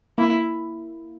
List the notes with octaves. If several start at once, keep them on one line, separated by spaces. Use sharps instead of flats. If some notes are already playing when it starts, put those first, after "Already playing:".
A#3 E4